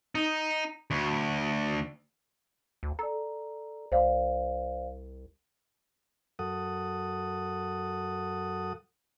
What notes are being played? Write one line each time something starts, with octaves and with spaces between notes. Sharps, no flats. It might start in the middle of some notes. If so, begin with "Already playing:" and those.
D#4
D2
D2
A4 D5 A#5
C2 C5 D5 F5
F#2 A4 F#5 D#6